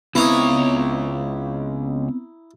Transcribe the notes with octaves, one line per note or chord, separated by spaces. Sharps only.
C#2 B3 C4 E4 C#5 A#5 D#6